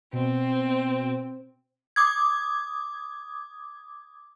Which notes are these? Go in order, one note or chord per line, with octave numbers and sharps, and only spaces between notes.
B2 C4
D6 D#6 G#6